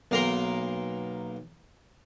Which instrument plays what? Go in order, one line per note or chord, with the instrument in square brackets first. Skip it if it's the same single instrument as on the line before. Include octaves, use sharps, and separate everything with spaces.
[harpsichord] B1 A#3 A#4 A#5 C6